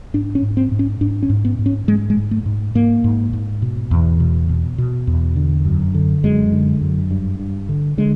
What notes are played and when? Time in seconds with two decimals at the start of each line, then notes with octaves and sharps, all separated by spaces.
0.14 G#2 D4
0.35 C#4
0.42 G#2
0.57 C4
0.72 G#2
0.79 C#4
1.01 G#2 D4
1.23 C#4
1.30 G#2
1.45 B3
1.59 G#2
1.66 C#4
1.88 G#2 G#3
2.10 G#3
2.17 G#2
2.31 A3
2.46 G#2
2.75 G#2 A#3
3.04 G#2
3.33 G#2
3.62 B2
3.91 E2
4.20 B2
4.49 B2
4.78 B2
5.07 E2
5.36 D3
5.65 F#2
5.94 D3
6.24 F#2 G#3
6.52 D3
6.81 F#2
7.11 G2
7.40 G2
7.69 D3
7.98 D3 G#3